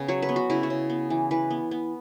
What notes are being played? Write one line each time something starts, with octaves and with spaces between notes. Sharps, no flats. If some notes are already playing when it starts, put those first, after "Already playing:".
Already playing: C#3 B3
F#3 C#5
B4
B3
F#4
C#3 E4
F#4
C#3
B3
E3
E3 B4
B3
B3